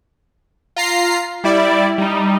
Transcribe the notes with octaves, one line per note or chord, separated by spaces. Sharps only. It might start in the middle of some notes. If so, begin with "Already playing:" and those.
F4 A#5 C7
G3 E4 D5
G3 D#4